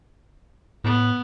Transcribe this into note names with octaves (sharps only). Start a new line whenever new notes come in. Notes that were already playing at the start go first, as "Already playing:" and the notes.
A2 B3